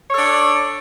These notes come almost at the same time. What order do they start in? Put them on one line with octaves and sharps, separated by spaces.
C#5 A4 D4